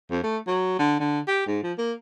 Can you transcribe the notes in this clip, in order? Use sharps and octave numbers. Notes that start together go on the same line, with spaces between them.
F2
A3
F#3
D3
D3
G4
G#2
F3
A#3